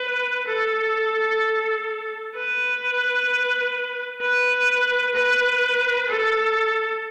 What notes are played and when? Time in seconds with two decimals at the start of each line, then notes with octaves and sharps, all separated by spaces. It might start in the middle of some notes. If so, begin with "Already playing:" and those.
Already playing: B4
0.47 A4
2.35 B4
4.21 B4
5.15 B4
6.09 A4